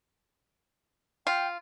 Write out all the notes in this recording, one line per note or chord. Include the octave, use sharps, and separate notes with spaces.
F4 G5